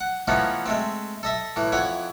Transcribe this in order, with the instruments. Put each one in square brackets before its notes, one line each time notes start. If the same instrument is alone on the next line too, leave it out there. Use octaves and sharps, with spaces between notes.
[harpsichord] F#5
E3 F3 A3 B3 C#4 D#4
G#3 A3 C4
A4 D#5 E5
A2 E3
F2 E4 C#5 F#5 G#5